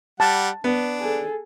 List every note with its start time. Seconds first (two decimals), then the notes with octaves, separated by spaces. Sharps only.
0.20 G3 F#5 A5
0.64 B3 D4
1.01 G#4 A4